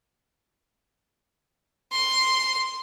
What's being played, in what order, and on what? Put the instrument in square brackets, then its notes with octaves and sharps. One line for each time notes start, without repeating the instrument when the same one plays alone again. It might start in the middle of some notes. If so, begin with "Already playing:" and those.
[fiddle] C6